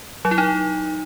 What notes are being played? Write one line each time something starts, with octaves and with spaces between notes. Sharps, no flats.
F#3
E4
D#4